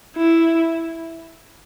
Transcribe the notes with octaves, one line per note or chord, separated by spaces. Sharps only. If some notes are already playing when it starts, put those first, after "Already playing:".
E4